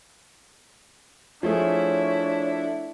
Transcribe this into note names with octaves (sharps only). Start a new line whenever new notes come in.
F3 A3 D4 E4 G#4 C#5